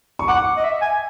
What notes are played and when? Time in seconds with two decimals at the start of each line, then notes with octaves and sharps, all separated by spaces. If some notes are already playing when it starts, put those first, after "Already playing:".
0.19 C#6
0.28 F#5 D6
0.57 D#5
0.64 E5
0.81 G#5